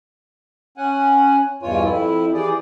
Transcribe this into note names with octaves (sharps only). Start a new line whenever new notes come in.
C#4 F#5 G#5
E2 G2 B2 F4 C#5 G#5
F2 E4
E3 G4 G#4 D5